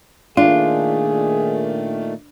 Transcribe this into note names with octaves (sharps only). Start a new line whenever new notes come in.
A#2 D#3 A3 D4 F4 G#4